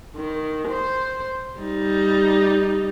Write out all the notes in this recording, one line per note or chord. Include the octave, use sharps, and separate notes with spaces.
D#3
C5
G3 D#4